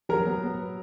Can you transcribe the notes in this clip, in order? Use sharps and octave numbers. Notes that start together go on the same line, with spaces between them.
F#3 A#4 A#5
B3
B3